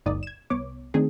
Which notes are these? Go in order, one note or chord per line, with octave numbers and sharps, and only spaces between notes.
G1 D2 D#4 D5 D#6
G#6 E7
C2 B3 C#5 D6
D#3 A3 C4 D4 D#4 G#4